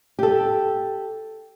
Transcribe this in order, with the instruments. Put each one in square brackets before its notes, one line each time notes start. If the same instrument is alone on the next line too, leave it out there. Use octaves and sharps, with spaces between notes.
[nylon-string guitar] G4 A4